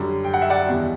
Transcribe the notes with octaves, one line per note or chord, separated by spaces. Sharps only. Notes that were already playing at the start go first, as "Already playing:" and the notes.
Already playing: F#2 D3 G3
G5
F#5
E5
D5 F#5
E2 B2 G3